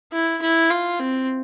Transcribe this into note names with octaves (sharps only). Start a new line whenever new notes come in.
E4
E4
F4
C4